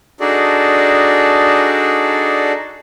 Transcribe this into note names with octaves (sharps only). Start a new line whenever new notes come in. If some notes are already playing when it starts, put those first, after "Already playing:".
D4 D#4 F#4 G#4 A4 D5